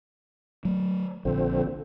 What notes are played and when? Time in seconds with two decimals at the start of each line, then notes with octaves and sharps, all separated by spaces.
0.65 F#3 A3
1.25 A#1 D3 F3 C4